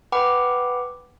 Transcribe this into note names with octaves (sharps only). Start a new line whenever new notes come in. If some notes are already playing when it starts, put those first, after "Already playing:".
B4 F#5 G5 B5 D6